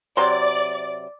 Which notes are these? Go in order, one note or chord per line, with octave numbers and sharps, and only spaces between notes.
C3 F#3 D5 C6